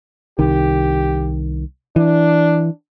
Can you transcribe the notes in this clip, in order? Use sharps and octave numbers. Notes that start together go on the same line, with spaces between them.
C2 D#3 G4
E3 D4